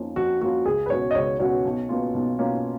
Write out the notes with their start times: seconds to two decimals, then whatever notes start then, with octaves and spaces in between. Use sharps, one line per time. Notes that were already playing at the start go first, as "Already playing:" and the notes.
Already playing: F2 F3 A#3 C#4 F4
0.16 F2 F#4
0.41 F3 A#3 C#4 F4 F#4
0.66 C#2 G#4
0.86 B4
0.90 B2 F#3 C#4 F#4 C#5
1.11 D#5
1.15 C#2 C#5
1.40 B2 F#3 C#4 F#4 C#5
1.65 B1
1.89 B2 A#3 C#4 F4
2.14 B1
2.39 B2 A#3 C#4 F4